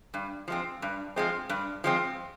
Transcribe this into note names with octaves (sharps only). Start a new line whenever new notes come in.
G2
F3 G#3 C4
G2
F3 G#3 C4
G2
F3 G#3 C4